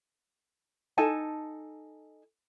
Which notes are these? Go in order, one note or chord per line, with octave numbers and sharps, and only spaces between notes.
D#4 A4 G#5 A5